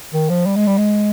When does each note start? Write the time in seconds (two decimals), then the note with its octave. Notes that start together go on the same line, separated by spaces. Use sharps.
0.14 D#3
0.30 F3
0.46 G3
0.56 G#3
0.67 G3
0.77 G#3